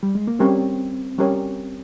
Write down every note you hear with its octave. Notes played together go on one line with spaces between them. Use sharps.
G3
G#3
A#3
G3 C4 C#4 G4 A#4 C#5
G3 C#4 G4 A#4 C#5